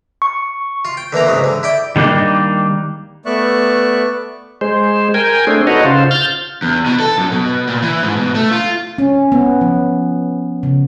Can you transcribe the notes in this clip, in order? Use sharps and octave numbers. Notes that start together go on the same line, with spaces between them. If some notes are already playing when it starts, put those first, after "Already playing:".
C#6
F4
G5
D3 E3 A#3 A#5
G#2 C#3 F#3
D3
E4 D5 G5
D#3 G3 A#3 D4 D#4
A3 B3 D5 E5 C#6 F#6
G#3 C5
A#4 G5 G#5
A3 C4 D4 G#4
D#4 F#4 A4 B4 C#5 D#5
C#3 F4 C5
F6 G6 A6
E2
B2
A4
F#2
B2
A#2
E3
G#2
B2
A3
F4
C#4
B3
F3
C#3